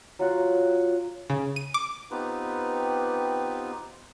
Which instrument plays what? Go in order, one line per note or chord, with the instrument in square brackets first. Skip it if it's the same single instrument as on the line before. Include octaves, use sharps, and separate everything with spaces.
[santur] F#3 F4 F#5
[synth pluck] C#3
D#7
D6
[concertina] B3 C4 D#4 F4 G4 B4